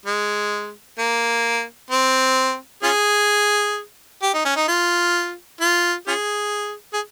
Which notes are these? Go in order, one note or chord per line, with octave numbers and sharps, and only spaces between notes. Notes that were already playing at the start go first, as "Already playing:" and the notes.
G#3
A#3
C4
C#4 F4 G#4
G4
D#4
C#4
D#4
F4
F4
C#4 F4 G#4
G#4